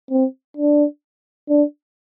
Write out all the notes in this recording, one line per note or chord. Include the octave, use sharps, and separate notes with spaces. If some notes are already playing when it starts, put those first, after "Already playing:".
C4
D4
D4